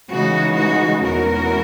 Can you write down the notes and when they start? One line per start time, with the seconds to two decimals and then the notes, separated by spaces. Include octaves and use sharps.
0.11 C#3 E3 G#3 D#4 F#4
0.57 F#4
1.03 E2 B2 G#3 C#4 E4 F#4 A#4